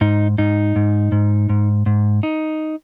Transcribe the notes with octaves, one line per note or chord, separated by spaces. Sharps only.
G#2 D#4
G#2 D#4
G#2
G#2
G#2
G#2
D#4